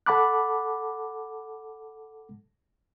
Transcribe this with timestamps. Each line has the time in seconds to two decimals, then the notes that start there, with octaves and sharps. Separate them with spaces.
0.06 A4 F#5 A5 B5 D6 F#6